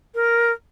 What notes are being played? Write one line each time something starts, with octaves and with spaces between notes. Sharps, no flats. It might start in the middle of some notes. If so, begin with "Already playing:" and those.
A#4